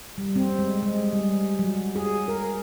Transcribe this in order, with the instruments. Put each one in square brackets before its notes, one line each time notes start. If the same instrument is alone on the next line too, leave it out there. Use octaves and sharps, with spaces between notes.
[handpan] G3
C4
G#3
G#3
G3
F#3
G#4
A#4